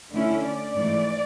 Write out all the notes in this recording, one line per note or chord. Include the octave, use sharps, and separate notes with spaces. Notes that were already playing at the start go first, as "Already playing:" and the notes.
D3 A3 C#4 E4
D5
G#2 E3 A3 D5